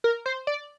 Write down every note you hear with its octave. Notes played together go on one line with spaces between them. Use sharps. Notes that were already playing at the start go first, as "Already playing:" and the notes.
A#4
C5
D5